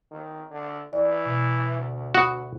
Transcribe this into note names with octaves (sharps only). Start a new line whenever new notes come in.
D#3
D3
E3 D5
B2
D2
F#4 B5 D#6